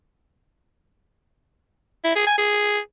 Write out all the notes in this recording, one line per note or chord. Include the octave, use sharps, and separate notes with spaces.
E4
G#4
G#5
G#4